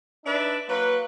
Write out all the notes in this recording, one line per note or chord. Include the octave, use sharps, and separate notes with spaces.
D4 D#4 B4 D5 E5
F#3 A#3 B4